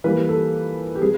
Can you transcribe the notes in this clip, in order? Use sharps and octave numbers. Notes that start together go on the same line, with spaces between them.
E3 G3 A#3 B4
A4
G4
G3 C4 G#4